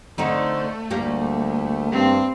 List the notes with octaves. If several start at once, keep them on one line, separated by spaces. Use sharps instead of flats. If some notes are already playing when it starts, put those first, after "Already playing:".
D3 A3 C4 D#4
D2 G3 A#3 G4
G2 C4